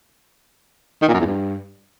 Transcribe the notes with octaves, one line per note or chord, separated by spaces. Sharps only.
D#3
A#2
F#2
E2
G2